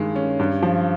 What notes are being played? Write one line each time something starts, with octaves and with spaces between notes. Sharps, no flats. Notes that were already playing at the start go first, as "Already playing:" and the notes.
Already playing: G2 D#3 G#3
C#4
G2
F3